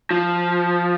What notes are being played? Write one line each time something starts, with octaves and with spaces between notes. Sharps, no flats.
F3